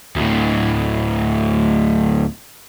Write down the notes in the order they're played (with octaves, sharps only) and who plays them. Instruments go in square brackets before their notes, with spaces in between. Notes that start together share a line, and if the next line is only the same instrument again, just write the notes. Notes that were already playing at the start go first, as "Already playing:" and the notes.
[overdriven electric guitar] D2 A2